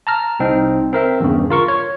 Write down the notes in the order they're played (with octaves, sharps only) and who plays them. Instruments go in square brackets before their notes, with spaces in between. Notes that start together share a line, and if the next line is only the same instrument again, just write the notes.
[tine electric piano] A5 A#5 F6
C2 C4 D#4
C4 A#4 E5
E2 G2 C#3
F4 A#4 C#6
C#5